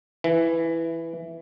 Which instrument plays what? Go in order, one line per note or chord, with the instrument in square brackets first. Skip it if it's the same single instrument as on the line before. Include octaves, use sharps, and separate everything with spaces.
[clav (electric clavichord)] E3